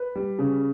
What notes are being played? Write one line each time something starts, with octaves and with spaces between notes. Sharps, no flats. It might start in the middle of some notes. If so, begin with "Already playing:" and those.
Already playing: B4
G3
C#3